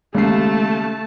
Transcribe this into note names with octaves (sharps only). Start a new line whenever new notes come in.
D#2 C#3 G#3 A3 A5 C7